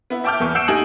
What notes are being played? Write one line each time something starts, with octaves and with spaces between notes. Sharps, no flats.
B3 E4
E5 G5 A5 D6 F6 G6
E2 E3 C#6
F#5 E6 G6 C7 D7 E7
A3 D#4 G4 G#5 D#6 F#7